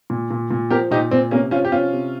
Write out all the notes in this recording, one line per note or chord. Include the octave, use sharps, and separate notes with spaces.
A#2
A#2
A#2
F3 G4 A#4
A#2 D#4 G4
A#2 C4
C3 A#3 C#4
F3 C#4 F4
G4
C3 C#4 F4
C3